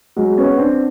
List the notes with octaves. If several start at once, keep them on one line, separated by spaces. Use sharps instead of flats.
F#3 G#3
B3 C#4
C4 D4